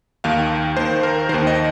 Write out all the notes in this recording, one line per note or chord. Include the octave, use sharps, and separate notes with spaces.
D#2 D#3 F5
D#2 D#3 C5
A#4
D#2 D#3 C5
D#5